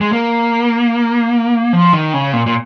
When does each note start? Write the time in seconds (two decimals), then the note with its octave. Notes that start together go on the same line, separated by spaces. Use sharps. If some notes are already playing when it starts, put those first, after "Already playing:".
0.01 G#3
0.12 A#3
1.73 F3
1.93 D#3
2.14 C#3
2.33 A#2
2.46 A#2